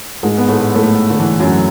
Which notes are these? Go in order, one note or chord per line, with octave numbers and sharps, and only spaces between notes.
G#2 G#3
B3
A2 A3
A2 A3
D3
E3
F#2 F#3